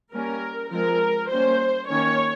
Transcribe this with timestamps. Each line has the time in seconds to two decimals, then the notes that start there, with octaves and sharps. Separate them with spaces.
0.13 G3 A#3 C#4 A#4
0.70 F3 G#3 C4 A#4
1.30 G3 A#3 C#4 C5
1.88 D#3 A#3 C#4 C#5